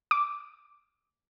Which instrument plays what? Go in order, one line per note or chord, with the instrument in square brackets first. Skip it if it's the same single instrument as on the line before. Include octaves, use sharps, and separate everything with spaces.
[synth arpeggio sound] D6